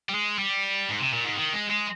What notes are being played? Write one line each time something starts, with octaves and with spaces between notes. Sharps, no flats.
G3
G#3
G3
G#2
C3
A#2
G#2
D#3
G#3
G#3